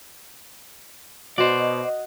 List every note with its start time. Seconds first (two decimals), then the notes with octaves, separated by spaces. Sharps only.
1.38 B2 F#4 C5 D5 D#5